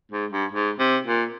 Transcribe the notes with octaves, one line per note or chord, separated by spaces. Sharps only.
G#2
G2
G#2
C3
A#2